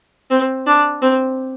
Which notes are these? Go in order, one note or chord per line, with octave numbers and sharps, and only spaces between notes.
C4
D4
C4